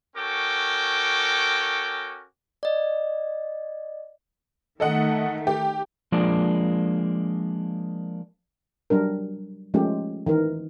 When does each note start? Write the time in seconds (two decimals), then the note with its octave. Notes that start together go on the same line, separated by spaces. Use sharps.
0.16 C#4 F#4 A4 A#4 G5 D6
2.63 D5 D#5
4.80 D#3 A3 A4 D#5 F#5
5.47 G4
6.12 F3 G#3 A#3 D4 D5
8.90 F#3 G3 D4 A#4
9.74 F3 G#3 A3 C#4 G4
10.27 D#3 E3 A#4